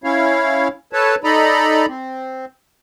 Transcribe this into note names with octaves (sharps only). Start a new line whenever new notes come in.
C#4 E4 C#5 F5
A4 B4 C#5 A5
D#4 A4 D5 D#5 A#5 B5
C4